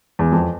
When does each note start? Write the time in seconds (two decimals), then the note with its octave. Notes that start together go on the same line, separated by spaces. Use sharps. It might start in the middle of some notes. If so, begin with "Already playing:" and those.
0.19 E2
0.32 F2